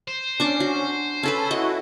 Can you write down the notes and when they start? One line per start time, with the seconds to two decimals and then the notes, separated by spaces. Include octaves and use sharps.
0.08 C5
0.40 C#4 D4 C#6 D6
0.60 F#4
1.23 C#4 A4 B4 A5 B5 E6
1.51 E4 F#4 D#5 F#5